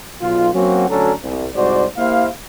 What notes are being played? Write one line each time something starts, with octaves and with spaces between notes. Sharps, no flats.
B1 F4
F#3 A#3 C4 C#4 F#4
D2 F#3 C#4 D4 A4 A#5
C2
C2 G#2 F#4 C5 D5
A#3 E4 G4 C5 F5